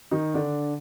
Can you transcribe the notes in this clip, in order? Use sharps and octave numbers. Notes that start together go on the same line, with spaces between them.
D#3 D#4
D3 D4